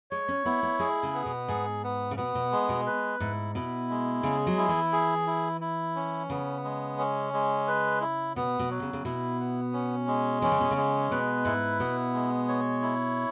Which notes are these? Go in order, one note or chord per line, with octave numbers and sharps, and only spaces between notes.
G#3 C#5
C#4
B3 E4
B3
G#3 G#4
C#3
B3
B2
G#2 G#4
B3
C#3
B2 B3
B2
G#3
B2
B4
G#2 E4
B2 E4
G#3
C#3 G#4
F#3
E4
E3
G#4
E4
E4
C#4
C#3 B3
G#3
C#4
G#3
B4
E4
B2 B3
B2
F#3
C#3
C#3
B2 E4
B3
C#4
G#3
E3 C#4
C#3
B2
C#3
G#3
B2 B4
G#2 E4
B2 B3
G#3
C#5
E4